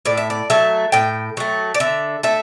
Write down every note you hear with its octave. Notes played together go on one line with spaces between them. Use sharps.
A2 D5
E5
D5
F#3 A3 E5
A2 G5
F#3 A3
D5
D3 E5
A3 E5